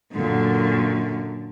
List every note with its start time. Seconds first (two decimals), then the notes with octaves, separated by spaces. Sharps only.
0.13 F#2 A#2 D3